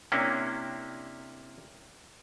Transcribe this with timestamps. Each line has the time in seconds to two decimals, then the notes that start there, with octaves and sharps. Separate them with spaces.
0.12 C3 A#3 C#4 D4 E4